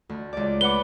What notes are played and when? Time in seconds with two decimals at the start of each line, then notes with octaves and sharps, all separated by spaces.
0.09 D2
0.33 C#2 D5
0.61 B4 F#5 D6 G7